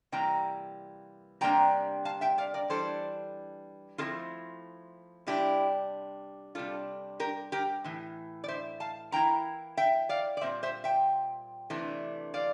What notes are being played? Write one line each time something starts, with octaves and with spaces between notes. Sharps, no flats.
C3 E3 G3 A#3 G5 A#5
C3 G3 A#3 D4 G5 A#5
F5 A5
E5 G5
D5 F5
A#4 D5
E3 G3 D4 A4 C5
F3 A3 C4 E4 F4 A4
C3 G3 D4 E4 G4
C3 G3 D4 F4 A4
G4 A#4
G4 A#4
A2 E3
D5
C5 E5
F5 A5
E3 A#3 E4 G5 A#5
E5 G5
D5 F5
D5
A#2 G3 C4 C5 E5
C5 E5
E5 G5
C3 E3 A3 D4
D5 F5